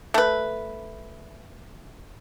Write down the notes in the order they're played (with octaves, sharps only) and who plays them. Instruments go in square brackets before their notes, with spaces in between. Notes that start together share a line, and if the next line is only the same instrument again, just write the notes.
[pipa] A3 B4